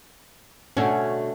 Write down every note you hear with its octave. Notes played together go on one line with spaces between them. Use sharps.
B2 D3 A3 C#4 F#4